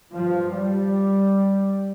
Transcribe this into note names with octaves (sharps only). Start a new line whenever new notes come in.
G2 F3
G3